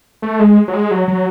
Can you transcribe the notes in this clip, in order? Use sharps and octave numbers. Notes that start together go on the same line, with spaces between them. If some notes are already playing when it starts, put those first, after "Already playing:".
A3
G#3
F#3
G#3
F#3
F#3